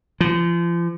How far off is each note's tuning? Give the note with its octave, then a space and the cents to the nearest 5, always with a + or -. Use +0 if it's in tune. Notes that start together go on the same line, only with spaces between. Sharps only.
F3 -35